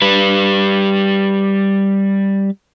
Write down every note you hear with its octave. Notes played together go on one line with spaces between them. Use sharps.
G3 B4